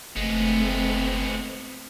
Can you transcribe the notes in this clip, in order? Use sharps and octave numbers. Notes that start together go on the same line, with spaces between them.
F#1 G#3 A3 B3 C4